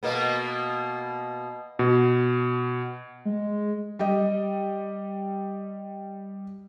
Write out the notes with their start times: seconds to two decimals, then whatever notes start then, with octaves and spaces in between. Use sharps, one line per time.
0.03 B2 A#3 B3
1.79 B2
3.25 G#3
3.99 G3 G4 D#5